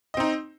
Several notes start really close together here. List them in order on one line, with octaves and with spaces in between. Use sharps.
D#5 C4 D#4